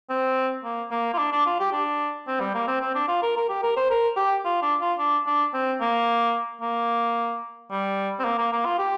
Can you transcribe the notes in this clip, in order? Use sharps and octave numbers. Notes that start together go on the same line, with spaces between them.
C4
A#3
A#3
F4
D4
D4
F4
G4
D4
C4
G3
A#3
C4
C4
D4
F4
A#4
A#4
G4
A#4
C5
A#4
G4
F4
D4
F4
D4
D4
C4
A#3
A#3
G3
C4
A#3
A#3
A#3
F4
G4